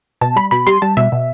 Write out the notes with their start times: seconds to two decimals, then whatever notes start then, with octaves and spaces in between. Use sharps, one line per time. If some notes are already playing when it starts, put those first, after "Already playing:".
0.21 B2 A5
0.36 G3 B5
0.51 B2 B5
0.67 G3 C6
0.82 G3 A5
0.97 B2 E5
1.12 B2